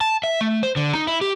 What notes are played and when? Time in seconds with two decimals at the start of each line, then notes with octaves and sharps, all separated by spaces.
0.01 A5
0.24 E5
0.41 A3
0.63 C5
0.76 D3
0.95 D#4
1.07 E4
1.21 G4